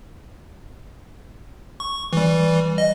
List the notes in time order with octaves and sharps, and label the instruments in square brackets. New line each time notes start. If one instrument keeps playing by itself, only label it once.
[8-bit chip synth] C#6
E3 G3
D#5